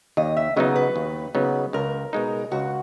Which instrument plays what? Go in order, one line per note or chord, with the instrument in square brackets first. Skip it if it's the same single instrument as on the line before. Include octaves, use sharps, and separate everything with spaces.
[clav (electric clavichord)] D#2 [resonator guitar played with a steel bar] D#5
[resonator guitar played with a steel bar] E5
[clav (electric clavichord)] C#3 F#3 B3 D#4 [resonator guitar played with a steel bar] D#5
[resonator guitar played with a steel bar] B4
[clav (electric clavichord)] D#2
C#3 F#3 B3 D#4
[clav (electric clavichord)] C#2 [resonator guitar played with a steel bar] A#4
[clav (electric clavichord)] B2 G#3 D#4
[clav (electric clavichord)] C#2 [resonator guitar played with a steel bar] F#4